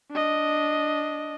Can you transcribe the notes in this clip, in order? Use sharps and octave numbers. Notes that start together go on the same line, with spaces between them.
D4 D#5